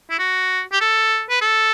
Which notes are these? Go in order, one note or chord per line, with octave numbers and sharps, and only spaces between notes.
E4
F#4
G4
A4
B4
A4